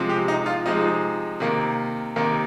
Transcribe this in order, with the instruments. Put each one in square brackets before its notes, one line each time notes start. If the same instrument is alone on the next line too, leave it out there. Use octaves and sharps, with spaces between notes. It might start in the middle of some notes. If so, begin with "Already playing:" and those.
Already playing: [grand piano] C3 F3 G#3
G4
D#4
F4
C3 F3 G#3 D#4
C3 D#3 A#3
C3 D#3 A#3